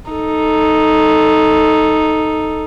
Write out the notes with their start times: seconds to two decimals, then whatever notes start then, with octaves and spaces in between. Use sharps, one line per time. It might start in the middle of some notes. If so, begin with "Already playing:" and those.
0.10 D#4 A4